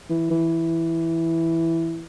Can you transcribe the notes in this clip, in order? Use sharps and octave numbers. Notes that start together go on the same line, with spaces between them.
E3
E3